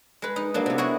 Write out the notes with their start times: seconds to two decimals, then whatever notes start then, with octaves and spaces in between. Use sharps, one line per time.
0.22 G#3 B4
0.36 D#4
0.54 F#3 A#3 D4
0.66 C3 B3
0.78 E4 F#4 G#4 C#5 D#5